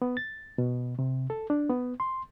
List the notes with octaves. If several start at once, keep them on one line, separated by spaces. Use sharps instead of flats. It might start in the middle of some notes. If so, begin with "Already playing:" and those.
B3
A6
B2
C3
A4
D4
B3
C6